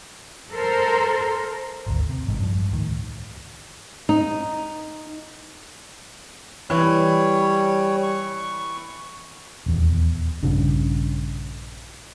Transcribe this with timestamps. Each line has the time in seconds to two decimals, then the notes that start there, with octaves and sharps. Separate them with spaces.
0.52 A4 A#4 C5
1.86 G#1 D2
2.09 C3
2.27 A1 G#2
2.40 G2 F3
2.71 C#2 A2 D#3
4.09 D#4
6.70 E3 G3 C#5
8.03 C#6
9.66 D#1 E2
10.43 A#1 G2 C#3 D4